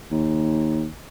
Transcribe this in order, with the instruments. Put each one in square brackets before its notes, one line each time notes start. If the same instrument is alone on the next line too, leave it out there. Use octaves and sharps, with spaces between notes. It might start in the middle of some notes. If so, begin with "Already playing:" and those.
[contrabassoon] D#2